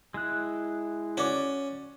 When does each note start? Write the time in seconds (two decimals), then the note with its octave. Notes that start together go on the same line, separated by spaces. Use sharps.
0.14 G#3 E4 F#6
1.17 C#4 F#4 D5